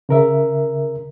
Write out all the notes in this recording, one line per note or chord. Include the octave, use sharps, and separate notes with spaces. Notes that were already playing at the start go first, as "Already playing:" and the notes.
C#3 A#4 E5